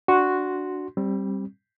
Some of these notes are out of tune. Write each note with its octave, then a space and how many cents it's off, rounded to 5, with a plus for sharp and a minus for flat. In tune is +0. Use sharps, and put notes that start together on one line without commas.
D4 +0 F#4 +0 C6 +0
G3 +0 C4 +25